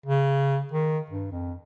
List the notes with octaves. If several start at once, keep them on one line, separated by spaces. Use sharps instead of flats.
C#3
D#3
G2
F2